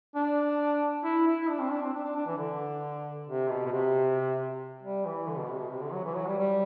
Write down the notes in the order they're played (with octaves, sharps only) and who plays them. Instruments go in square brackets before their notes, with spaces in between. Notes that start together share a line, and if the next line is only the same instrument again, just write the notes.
[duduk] D4
E4
E4
D4
C4
D4
C4
D4
D4
D4
E3
D3
C3
B2
B2
C3
G3
E3
D3
B2
C3
B2
C3
D3
F#3
E3
F#3
G3
G3